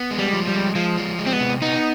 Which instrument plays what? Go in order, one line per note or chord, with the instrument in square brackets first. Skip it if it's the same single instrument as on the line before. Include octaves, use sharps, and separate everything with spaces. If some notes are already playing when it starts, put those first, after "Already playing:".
Already playing: [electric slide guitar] B3
G#3
[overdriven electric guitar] G3
[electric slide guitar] F3
[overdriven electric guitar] G3
[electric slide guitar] G#3
[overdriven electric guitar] F3 [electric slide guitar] G#3
[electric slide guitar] F3
G#3
[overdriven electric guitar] C4
B3
[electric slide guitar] C3
[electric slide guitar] B3 [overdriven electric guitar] D#4